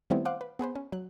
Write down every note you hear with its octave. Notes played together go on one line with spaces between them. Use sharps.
D#3 G3 A3 B3 C4 E4
C5 F5 F#5 D6
B4
B3 G#4 B4 C5
C#4
F#3 F#6